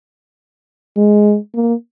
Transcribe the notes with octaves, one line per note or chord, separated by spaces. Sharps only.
G#3
A#3